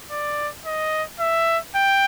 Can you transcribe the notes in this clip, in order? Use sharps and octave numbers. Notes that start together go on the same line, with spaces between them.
D5
D#5
E5
G5